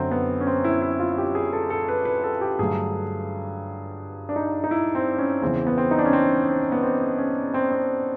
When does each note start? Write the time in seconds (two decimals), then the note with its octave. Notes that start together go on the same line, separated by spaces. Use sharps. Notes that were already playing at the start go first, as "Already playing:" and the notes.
Already playing: F#2 D3 F#3 C4
0.11 B3
0.41 C#4
0.47 C4
0.64 E4
0.82 E4
1.00 F4
1.18 G4
1.35 G#4
1.53 A4
1.70 A4
1.88 B4
2.05 B4
2.24 A4
2.41 G4
2.59 G2 D3 F#3 A3 G#4
4.29 D4
4.36 D#4
4.64 D#4
4.71 E4
4.95 C4
5.18 C#4
5.42 E2 C#3 E3 C4
5.67 B3
5.78 C4
5.91 D#4
5.99 D4
6.05 C#4
6.13 C4
6.48 C4
6.72 B3
6.83 C4
7.18 C#4
7.54 C4
7.72 C4